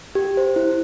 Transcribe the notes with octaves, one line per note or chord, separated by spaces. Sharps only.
G4
C5
E4